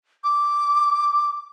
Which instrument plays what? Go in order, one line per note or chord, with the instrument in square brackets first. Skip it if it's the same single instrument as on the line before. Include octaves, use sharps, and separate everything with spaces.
[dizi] D6